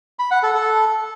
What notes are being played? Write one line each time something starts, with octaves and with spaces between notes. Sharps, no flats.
B5
F#5
A4
A4